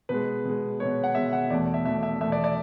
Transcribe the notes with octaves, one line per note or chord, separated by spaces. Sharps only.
B2 G#3 B4
B2 G#3
B2 G#3 C#5
F#5
B2 G#3 E5
F#5
E2 B2 A3 D5
E5
E2 B2 A3 E5
E5
E2 B2 A3 E5
D5
D5